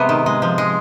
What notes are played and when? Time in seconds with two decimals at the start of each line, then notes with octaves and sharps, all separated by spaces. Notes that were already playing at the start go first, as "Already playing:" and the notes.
Already playing: C3 G#3 B3
0.09 D#3
0.26 G#3
0.42 F3
0.58 G#3